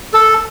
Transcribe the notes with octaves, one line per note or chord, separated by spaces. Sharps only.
A4